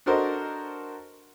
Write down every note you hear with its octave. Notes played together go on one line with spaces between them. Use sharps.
D4 F#4 A4 A#4 C5 D#5